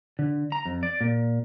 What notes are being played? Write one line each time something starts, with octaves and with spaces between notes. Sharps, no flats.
D3
A#5
F2
D5
A#2